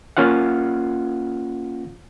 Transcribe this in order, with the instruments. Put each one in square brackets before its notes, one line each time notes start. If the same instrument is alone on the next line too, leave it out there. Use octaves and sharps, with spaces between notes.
[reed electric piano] A#3 C#4 F4 F5 F#5